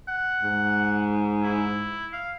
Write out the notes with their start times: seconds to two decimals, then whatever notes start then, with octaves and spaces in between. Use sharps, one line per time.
0.08 F#5
0.43 G#2
1.44 E4
2.13 F5